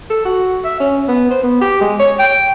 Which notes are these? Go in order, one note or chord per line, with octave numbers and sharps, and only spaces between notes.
A4
F#4
E5
C#4
B3
C5
B3
G4
G#3
C#5
G5